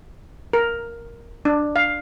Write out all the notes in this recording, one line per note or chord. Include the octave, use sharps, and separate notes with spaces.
A#4
D4
F5